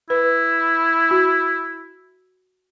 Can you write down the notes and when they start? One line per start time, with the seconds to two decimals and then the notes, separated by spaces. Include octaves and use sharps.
0.10 E4 B4
1.11 F#4